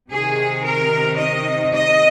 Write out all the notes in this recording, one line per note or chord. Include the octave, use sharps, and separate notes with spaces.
C3 D#3 G#4
A#4
D#5
D#5